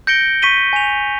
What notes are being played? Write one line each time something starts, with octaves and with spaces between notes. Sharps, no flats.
G6 A#6 C#7 D7 G7
C#6 B6 D#7 G7
G#5 F7